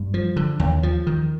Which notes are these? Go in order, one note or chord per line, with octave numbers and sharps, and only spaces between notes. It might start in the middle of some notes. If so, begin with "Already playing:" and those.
Already playing: G2
F3
D3
D#2
F3
D#3